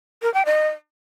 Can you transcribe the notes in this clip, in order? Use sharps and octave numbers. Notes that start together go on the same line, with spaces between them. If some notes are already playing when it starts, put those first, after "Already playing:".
A#4
G5
D#5